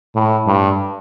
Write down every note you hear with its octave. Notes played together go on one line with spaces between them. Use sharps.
A2
G2